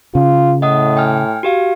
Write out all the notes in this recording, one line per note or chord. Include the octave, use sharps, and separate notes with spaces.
C#3 F4
A2 D#5 F#5 D#6
G5 G#5 F6
F#4 G4 F5